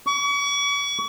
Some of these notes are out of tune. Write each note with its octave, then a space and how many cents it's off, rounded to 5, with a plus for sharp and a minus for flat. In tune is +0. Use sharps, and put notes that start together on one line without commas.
C#6 +40